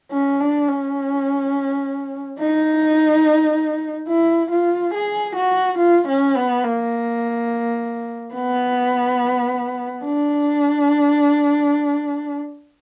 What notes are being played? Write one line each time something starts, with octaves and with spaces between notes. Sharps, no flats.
C#4
D4
C#4
D#4
E4
F4
G#4
F#4
F4
C#4
B3
A#3
B3
D4